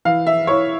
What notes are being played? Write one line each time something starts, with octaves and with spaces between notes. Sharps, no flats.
E3 F5
E5
E4 C#5